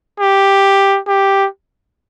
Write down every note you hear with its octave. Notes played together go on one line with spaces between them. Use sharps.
G4
G4